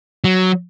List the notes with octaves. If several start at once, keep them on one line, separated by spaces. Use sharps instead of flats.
F#3